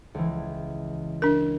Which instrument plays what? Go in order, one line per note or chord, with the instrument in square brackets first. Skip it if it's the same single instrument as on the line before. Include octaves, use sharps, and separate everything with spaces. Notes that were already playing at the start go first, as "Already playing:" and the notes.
[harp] C#2 E3
[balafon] D4 A#4